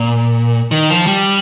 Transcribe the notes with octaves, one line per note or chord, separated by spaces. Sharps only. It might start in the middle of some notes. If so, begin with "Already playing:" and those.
Already playing: A#2
D#3
F3
G3